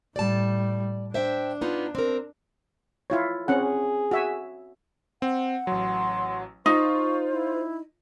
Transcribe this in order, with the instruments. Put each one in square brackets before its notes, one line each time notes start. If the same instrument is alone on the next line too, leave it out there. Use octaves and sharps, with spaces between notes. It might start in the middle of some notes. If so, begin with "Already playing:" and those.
[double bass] A2 G3 [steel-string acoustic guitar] D5 A5
[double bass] D4 [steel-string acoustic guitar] C5 E5 G5
[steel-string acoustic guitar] B3 D#4 F4
C4 A#4
[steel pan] E4 F4 C#5
[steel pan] C4 C#4 F#5 [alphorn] G#4
[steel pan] F#4 E5 G#5
[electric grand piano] C4 [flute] F#5
[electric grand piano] A1 F#3 [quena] C6
[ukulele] D#4 [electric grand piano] F4 [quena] C5 [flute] C#6
[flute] E4